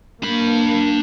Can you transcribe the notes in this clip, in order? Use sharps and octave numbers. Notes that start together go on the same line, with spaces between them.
A#3 D4 B5